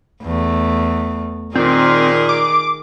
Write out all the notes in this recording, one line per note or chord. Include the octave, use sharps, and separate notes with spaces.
E2 A3
A#2 D#3 C4 G#4 A#4
D6